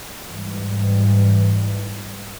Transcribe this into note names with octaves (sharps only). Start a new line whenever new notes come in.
G#2 E3 G3